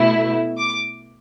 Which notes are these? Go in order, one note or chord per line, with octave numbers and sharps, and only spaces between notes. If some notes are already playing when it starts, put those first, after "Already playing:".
Already playing: B2 A3 E4
D6